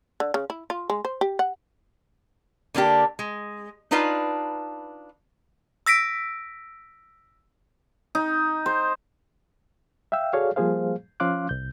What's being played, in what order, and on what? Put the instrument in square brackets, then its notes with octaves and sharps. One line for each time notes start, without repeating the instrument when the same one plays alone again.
[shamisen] D3
C#3
E4
F4
G#3
C5
G4
F#5
[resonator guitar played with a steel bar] D3 A#3 D4 G4
G#3
D4 D#4 F4 B4 F5
[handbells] E6 A#6 B6 D7
[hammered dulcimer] D#4
C5
[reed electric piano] E5 F5 G5 E6
F#4 G#4 A4 C#5 D5 F5
F3 G3 A#3 G#4 C5 F5
F3 C#4 F5 C6 D6 F#6
C2 G6